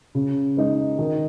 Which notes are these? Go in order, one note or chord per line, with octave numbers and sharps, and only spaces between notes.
C#3
G#3 D#4
D#3